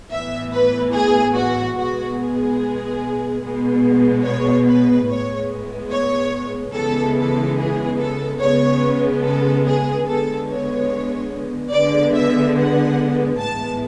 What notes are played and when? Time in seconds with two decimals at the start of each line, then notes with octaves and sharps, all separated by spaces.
0.10 A2 E3 B3 E5
0.52 B4
0.92 G#4
1.34 F#4
1.76 B2 G#3 B3 F#4
2.17 G#4
3.41 B2 G#3 B3
4.25 C#5
4.67 B4
5.08 A2 G#3 B3 C#5
5.90 C#5
6.73 C#3 E3 G#3 B3 A4
7.16 A4
7.57 G#4
7.99 A4
8.40 C#3 G#3 B3 C#5
9.23 A4
9.65 G#4
10.06 D3 G#3 B3 A4
10.48 C#5
11.72 D3 G#3 B3 D5
12.14 E5
12.55 F#5
13.38 A2 E3 G#3 B3 A5